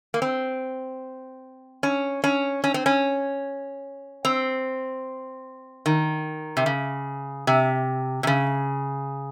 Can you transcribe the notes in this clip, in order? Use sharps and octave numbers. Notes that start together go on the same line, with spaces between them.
A#3
C4
C#4
C#4
C#4
C4
C#4
C4
D#3
C3
C#3
C3
C3
C#3